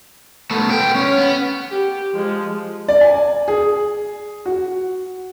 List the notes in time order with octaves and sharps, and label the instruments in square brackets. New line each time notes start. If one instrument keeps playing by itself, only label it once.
[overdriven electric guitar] A3 B3
B3 G5
C#4
B3
[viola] G4
F3 G#3
[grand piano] D5
G#5
G#4
F#4